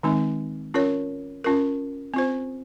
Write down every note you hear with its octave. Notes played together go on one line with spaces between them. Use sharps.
D#3 G#3 C4 D#4
C#4 F4 A#4 C#5
C#4 F4 A#4
C4 F4 C5